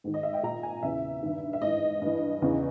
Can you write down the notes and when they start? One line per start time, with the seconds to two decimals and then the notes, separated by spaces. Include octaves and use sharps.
0.04 G#2 D#3
0.14 D#5
0.23 E5
0.33 G5
0.43 A#2 A#5
0.63 G#5
0.83 E2 C#3 E3 E5
1.23 G2 D#3
1.53 E5
1.62 G#2 E3 D#5
2.02 G2 E3
2.42 E2 C#3 E3